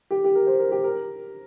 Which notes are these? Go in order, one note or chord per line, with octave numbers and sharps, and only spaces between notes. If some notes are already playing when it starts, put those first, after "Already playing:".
G4
G4
A#4
C5
A#4
G4
A#4